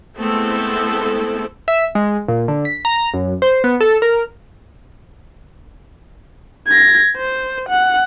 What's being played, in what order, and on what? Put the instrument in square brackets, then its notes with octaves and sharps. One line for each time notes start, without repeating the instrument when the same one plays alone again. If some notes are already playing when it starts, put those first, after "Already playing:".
[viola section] G#3 A3 B3 C4 E4 A4
[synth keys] E5
G#3
A#2
D3
B6
A#5
F#2
C5
B3
A4
A#4
[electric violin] G#6 A#6
C5
F#5